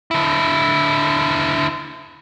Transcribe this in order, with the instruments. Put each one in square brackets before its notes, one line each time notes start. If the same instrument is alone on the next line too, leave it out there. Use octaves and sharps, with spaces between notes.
[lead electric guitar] D3 E4